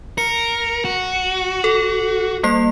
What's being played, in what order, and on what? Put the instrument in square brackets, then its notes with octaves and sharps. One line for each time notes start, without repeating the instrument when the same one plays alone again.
[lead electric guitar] A#4 [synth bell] C#7
[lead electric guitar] F#4
[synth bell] A4
G3 A#3 C7